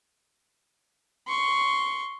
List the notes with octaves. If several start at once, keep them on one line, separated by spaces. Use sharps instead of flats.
C6 C#6